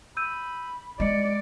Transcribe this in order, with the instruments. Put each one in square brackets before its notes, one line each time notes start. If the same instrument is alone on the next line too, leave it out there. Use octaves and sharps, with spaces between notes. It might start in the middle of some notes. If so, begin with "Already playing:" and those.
[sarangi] B5 [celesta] E6 G6 D#7
[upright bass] G#3 [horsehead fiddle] D5 [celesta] D#5 C#7